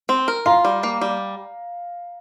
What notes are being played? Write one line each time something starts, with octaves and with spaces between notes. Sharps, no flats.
C4
A#4
F4 F5 A#5
G3
A#3
G3